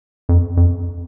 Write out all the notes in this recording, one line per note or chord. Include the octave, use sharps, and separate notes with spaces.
F2
F2